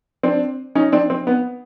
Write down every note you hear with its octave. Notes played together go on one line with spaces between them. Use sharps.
C4 D4
C#4 D#4
C4 D4
C4
B3